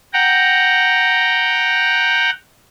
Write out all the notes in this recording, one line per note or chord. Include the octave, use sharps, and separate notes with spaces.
F#5 G5 A#5